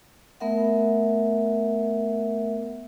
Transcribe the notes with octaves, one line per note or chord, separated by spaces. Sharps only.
A3 B3 A#4 E5 F#5